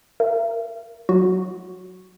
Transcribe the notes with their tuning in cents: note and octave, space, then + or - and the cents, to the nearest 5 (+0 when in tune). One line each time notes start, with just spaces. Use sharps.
A#4 +0 E5 +45
F#3 +0 F#4 +0